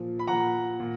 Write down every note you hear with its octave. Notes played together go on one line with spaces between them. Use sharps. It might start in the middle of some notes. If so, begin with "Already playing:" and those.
Already playing: A#2 F3
B5
A#2 F3 F#5 A#5
A#2